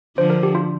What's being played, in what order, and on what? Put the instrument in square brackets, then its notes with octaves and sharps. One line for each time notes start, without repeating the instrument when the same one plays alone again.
[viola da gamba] D3 F3 [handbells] C5
[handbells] A#4
G4
F4